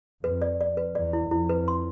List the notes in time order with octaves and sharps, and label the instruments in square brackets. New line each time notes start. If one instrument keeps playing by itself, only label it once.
[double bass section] F2 [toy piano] B4
[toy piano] D5
D5
B4
[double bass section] E2 [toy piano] D5
[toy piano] E4
[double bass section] F2 [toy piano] E4
[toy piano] B4
C6